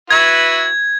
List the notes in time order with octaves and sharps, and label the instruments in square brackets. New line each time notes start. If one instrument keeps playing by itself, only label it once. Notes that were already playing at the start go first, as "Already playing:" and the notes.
[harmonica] E4 F#4 B4 [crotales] G#6